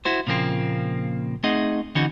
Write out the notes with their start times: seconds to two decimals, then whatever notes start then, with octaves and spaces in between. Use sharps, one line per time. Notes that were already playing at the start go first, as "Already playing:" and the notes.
0.05 E4 F#4 C5
0.27 A#2 C#3 F3 A#3 C4
1.44 A3 C4 D#4 G#4 D#5 F#5
1.95 D3 E3 C#4 D#4 F#4